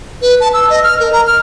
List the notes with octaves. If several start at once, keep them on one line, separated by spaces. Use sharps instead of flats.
B4
A5
E6
D#5
F6
A#4
A#5
F6